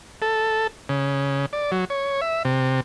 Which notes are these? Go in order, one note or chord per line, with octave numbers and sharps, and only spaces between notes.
A4
C#3
D5
F#3
C#5
E5
C3